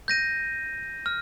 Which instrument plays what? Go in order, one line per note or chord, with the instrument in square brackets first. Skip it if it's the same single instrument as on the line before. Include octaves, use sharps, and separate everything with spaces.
[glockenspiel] G6 A#6 D#7
F6